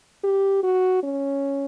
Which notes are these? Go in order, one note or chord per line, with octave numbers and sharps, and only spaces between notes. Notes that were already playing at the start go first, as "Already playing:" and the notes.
G4
F#4
C#4